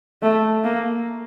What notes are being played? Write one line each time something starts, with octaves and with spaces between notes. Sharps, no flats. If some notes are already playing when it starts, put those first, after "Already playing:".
A3
A#3